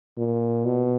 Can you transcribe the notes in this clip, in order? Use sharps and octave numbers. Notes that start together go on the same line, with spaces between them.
A#2
B2